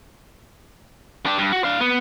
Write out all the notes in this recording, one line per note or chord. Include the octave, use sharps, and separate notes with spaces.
D4 G4
G2
F#4
D4 F5
B3